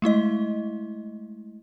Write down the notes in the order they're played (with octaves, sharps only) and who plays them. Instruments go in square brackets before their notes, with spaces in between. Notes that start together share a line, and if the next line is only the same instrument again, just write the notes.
[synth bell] G#3 A3 E4 D#5